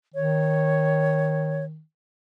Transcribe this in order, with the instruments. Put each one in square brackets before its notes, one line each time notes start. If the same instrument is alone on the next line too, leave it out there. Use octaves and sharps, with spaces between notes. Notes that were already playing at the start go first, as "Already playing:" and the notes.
[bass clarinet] D#3 [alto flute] C#5